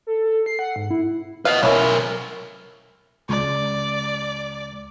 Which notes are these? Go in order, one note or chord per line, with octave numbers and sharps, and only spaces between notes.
A4
A4
C7
F#5
G#2
E4
B4 D#5 F5
B1 C#4 E4 A#4
C#2 D5